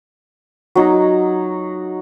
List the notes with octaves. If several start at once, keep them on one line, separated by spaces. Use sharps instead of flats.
F#3 D#4